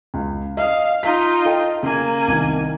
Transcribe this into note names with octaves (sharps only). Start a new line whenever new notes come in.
C#2
D#5 F5 D#6
D#4 F4 B6
A4 D#5 G5
C#3 A#3 G#5
C2 D#3